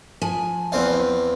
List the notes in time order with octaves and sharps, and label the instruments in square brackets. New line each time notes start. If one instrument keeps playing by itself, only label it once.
[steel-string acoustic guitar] F3 G#5
[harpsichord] E2 C4 F5